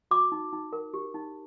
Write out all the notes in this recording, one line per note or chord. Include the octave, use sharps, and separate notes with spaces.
F#4 D6
D#4
D#4
A#4
G4
D#4